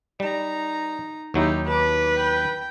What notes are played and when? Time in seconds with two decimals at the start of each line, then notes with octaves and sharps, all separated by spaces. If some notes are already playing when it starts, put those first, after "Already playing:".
0.20 G3 D#4 A#5
1.34 D#2 F#3 D#4 E4 G4
1.68 B4 A5 D6
2.16 G5